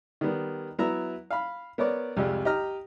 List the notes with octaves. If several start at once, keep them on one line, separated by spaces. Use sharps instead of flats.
D#3 G3 B3
F#3 B3 E4 E5 A#5
F5 B5
B3 A#4 C#5 D5
C2 F2 G3 G#3
G4 D#5 A#5 F6